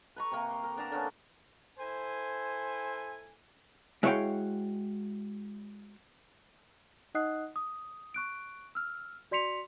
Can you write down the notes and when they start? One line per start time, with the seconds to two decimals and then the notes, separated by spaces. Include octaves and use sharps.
0.16 B4 A#5 C#6
0.31 C3 A#3
0.51 C6
0.63 A#4
0.76 B3 D4 A5 A#5
0.91 D3 A#3 B3 C#4
1.79 E4 A4 C5 G#5
4.03 G#3 E4 F#4 C#5 F5 G5
7.15 D#4 D#5 F#5 D#6 F#6 C7
7.56 D#6
8.14 C#6 F#6 D7
8.75 E6 F6
9.31 F#4 D5 C6 B6 C#7 F7